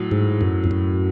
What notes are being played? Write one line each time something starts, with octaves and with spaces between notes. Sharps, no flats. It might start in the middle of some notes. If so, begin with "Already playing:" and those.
Already playing: A2 F#3
G#2
F#2
F2
F#2